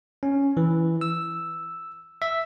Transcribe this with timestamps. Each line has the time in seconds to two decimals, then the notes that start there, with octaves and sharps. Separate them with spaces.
0.23 C#4
0.57 E3
1.01 E6
2.22 E5